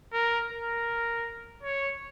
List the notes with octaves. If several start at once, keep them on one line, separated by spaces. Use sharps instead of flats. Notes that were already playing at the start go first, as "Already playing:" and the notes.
A#4
A#4
C#5